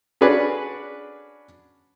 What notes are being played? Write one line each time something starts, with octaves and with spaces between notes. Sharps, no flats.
C#4 D4 F#4 G#4 B4 D5